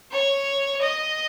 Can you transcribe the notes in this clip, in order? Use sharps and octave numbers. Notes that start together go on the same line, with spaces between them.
C#5
D#5